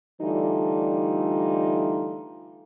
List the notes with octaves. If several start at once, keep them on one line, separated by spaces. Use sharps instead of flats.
D3 E3 G3 A3 D#4 F4